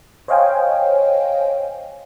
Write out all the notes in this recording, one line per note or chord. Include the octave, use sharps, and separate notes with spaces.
C5 C#5 D#5 F5 G5 G#5